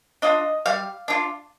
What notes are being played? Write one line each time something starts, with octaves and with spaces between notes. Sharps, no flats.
D4 F4 D#5
G3 F5
D4 F4